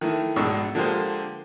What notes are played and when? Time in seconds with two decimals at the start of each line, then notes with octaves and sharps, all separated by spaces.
0.01 D#3 E3 A3
0.36 A#1 G#2 B2 D4 C#6 E6
0.75 D3 F3 G#3 A#3 G4 C5